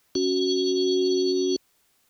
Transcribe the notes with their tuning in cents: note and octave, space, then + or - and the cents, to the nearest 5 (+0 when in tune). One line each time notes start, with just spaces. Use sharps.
C#4 +0 F#4 +0